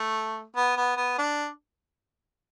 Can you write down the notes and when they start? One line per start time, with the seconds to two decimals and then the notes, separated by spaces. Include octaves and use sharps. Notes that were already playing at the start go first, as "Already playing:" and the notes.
Already playing: A3
0.56 B3
0.77 B3
0.97 B3
1.18 D4